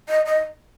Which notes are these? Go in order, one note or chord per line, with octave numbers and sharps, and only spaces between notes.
D#5
D#5